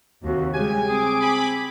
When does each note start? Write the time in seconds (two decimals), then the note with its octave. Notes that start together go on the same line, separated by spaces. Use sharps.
0.24 D#2 C3 F#4
0.54 C#3 G3 G#3 G4 G#5
0.89 C4 G#4 D6
1.21 G#5 B5